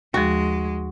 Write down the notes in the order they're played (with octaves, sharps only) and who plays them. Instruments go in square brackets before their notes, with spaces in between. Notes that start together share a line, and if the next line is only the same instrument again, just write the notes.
[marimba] D#2 F3 [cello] G#3 [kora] F#4